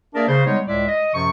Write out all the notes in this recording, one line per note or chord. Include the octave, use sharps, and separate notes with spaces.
A#3 D4 G#4 A#4 D5 E5
C#3 C5
G3 G#3 B3 D#4 C#5
C#2 A2 G#3 D5 E5
D#5
F#2 C3 F3 C#6